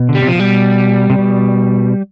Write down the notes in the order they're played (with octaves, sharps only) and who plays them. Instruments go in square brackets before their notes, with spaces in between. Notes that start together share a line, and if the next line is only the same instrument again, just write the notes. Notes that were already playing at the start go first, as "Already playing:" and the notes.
Already playing: [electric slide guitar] B2
D3
[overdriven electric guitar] G3
[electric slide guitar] C3
[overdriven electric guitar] F3
[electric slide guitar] B2 [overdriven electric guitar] G3
[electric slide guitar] C3
B2